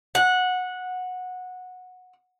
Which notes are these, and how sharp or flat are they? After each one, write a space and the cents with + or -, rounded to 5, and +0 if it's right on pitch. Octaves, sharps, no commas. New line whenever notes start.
F#5 -15